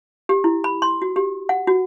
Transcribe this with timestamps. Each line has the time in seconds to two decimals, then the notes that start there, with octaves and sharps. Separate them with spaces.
0.29 G4
0.44 E4
0.64 B5
0.82 C6
1.02 F#4
1.16 G4
1.49 F#5
1.67 F#4